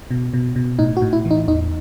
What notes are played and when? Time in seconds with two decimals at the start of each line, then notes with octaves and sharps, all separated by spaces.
0.11 B2
0.34 B2
0.56 B2
0.79 A2 D#4
0.97 F#4
1.02 A2
1.13 E4
1.25 E3
1.31 D#4
1.48 E2 D#4